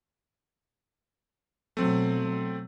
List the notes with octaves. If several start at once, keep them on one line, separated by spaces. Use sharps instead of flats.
B2 F#3 A3 C4